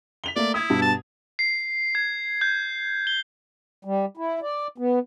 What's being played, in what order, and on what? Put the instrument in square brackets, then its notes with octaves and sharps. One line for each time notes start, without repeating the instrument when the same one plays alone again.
[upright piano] B6 F7 G7
[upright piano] A3 A#3 [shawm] D5
[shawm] E4 [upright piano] D#6 G#6
[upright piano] G2 B2
[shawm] A5
[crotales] C7
G#6
G6
G7
[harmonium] G3
E4
D5
B3